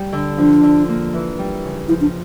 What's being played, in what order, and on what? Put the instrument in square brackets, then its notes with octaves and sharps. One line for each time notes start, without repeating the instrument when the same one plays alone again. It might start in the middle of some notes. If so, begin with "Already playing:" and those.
Already playing: [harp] G3
D3
[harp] F3 [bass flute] D4
[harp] D3
A#3
E3
G3
C#3
[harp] F3 [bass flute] E4
[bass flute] D4